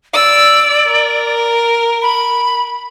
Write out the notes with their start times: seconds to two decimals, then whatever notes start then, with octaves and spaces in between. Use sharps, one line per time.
0.14 D5 E6
0.87 A#4
2.02 B5